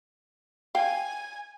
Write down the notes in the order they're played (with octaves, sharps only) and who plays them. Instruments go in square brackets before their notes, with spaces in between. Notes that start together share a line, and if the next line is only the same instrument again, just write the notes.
[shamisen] F5 G5 [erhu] G#5